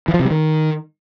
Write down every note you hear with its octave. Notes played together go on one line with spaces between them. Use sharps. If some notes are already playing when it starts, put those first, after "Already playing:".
E3
F3
C3
G3
D#3